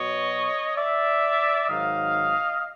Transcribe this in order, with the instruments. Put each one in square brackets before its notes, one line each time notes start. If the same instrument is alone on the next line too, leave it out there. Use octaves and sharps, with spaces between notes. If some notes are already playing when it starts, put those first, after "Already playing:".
Already playing: [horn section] B2 F#3 C#5 D#5
D5 E5
G#2 D#3 F#3 D#5 F5